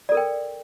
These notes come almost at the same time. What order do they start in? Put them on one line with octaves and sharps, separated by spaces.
D5 A4 A#4 G5